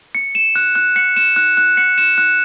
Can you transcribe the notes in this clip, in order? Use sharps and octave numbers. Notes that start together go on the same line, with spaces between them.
C#7
E7
F#6
F#6
C#7
E7
F#6
F#6
C#7
E7
F#6